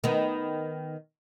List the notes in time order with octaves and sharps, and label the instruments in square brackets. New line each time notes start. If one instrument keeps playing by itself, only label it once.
[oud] D#3 B3